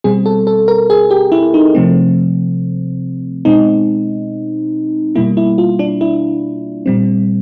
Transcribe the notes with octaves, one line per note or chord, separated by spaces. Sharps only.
B2 G3 C4 G#4
A4
A4
A#4
G#4
G4
E4
D#4
C3 F3 A3 C4
B2 G#3 C4 D#4
B2 G3 A#3 E4
E4
F4
D4
E4
A#2 G3 C4